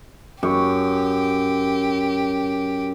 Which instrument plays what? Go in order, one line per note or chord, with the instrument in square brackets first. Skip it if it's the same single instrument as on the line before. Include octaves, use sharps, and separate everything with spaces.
[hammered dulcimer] F#2 C#6 [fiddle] G4